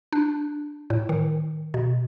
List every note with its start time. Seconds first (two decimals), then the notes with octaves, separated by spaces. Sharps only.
0.12 D4
0.90 A2
1.09 D#3
1.74 B2